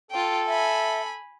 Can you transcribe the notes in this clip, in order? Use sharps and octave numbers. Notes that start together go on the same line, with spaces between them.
F4 A4 G5
E5 G#5 B5